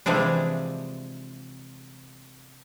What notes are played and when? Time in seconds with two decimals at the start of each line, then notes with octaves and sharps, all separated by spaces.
0.06 C3 E3 F3 G#3 D4